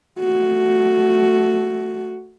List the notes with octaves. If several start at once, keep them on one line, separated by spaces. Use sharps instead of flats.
A3 F#4